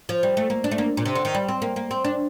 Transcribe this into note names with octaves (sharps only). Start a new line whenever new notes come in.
F3
G3
A3
A#3
D4
A3
A#3
A#2
C3
D3
D#3
G3
C4
A#3
A#3
C4
D4